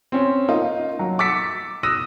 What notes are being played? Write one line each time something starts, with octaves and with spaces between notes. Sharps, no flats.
C4 C#4
A#3 D#4 F4
F#3
D6 E6 A6 B6 C#7
D#6 E6 F#6 A#6 D#7